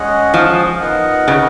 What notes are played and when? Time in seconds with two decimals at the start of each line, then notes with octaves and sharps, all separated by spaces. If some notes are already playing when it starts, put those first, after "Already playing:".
Already playing: G#3 C#4 G#4 D#5 F#5
0.34 F3
0.80 B3 D#4 A#4 D#5 F#5
1.28 C#3